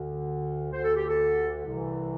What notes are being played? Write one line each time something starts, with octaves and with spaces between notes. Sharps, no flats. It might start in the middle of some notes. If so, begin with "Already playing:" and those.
Already playing: D2 D3
D2 D3 C5
A4
G4
A4
C2 C3 E3